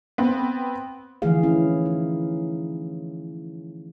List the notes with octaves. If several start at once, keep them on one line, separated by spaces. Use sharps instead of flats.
B3 C4
D3 E3 F3 A3 G#4 F5
F3 C#4 E4
D#4